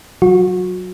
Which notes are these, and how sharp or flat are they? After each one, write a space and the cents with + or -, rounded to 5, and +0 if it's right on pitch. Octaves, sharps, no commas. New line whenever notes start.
F#3 +0 F#4 -30